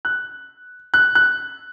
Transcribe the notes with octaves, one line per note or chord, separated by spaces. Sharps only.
F#6
F#6
F#6